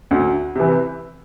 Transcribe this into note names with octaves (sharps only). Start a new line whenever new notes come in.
D2
C3 E3